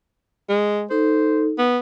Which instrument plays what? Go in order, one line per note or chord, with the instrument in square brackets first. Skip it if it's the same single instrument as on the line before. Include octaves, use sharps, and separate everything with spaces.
[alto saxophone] G#3
[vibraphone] D#4 A4 [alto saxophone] C5
[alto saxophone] B3